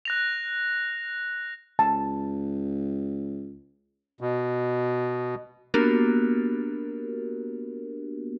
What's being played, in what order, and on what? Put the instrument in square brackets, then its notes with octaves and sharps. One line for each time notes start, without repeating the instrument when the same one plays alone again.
[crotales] F#6 A#6 F7
[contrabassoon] C#2 [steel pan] A5
[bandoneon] B2
[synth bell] A#3 B3 D4 F#4 G4 A#4